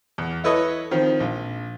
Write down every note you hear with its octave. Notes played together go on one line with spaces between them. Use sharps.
E2
E4 A4 B4 C#5 D#5
D#3 F3 C4
A#1